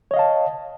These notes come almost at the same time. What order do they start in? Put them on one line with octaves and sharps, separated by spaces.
C#5 D#5 F5 A5